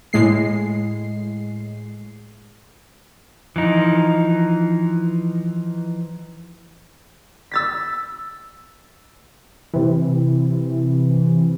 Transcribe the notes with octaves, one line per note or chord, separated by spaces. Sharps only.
A2 G#3 C7
E3 F3 D#4
E6 A6 B6
C3 E3